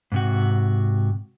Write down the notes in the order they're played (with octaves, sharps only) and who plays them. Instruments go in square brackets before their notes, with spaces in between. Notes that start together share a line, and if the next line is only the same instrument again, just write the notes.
[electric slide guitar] G#2 C3 F#4